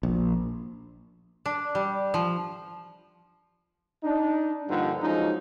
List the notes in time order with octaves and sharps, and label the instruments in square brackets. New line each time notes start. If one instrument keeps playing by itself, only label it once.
[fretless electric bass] A#1
[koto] D4
G3
F3
[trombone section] D4 D#4
G2 A#2 D3 F3 G3 D#4
F3 F#3 G#3 C#4 D#4